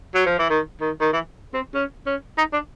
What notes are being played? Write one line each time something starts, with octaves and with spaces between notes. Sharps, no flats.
F#3
F3
E3
D#3
D#3
D#3
E3
C4
C#4
C#4
D#4
D4